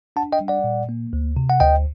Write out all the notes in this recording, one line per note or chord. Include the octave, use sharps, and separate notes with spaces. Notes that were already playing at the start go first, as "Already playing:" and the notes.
D4 F#5 A5
D#5 G5
G3
D5 F#5
A#2
A#3
D2
C3
F#5
D2 D#5 G5